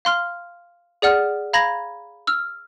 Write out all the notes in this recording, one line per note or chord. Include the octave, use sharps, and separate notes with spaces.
F5 C6 F6
G#4 D5 F#5 F6
F5 A#5 B5 G#6 A#6
E6 F6